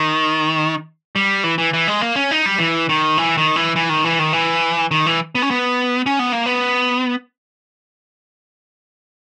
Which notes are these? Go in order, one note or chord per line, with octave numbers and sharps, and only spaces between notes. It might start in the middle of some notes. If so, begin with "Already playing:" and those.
Already playing: D#3
G3
E3
E3
E3
G#3
A#3
C#4
D#4
G3
E3
D#3
E3
D#3
E3
E3
D#3
E3
D#3
E3
D#3
E3
B3
C#4
B3
C#4
B3
A#3
B3